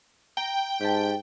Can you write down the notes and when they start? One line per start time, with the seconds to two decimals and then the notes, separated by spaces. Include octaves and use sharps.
0.37 G5 A#5
0.81 G#2 G4 A5